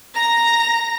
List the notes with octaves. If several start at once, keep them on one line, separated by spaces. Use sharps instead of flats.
A#5 A#6